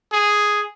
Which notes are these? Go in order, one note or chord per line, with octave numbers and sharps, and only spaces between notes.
G#4